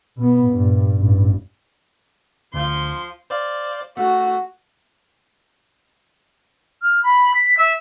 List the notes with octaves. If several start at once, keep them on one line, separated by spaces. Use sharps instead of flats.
B2 B3
G2 A#2
A1 G2
D2 F3 C6
C5 D5 F5
A3 F#4
F6
B5
B6
E5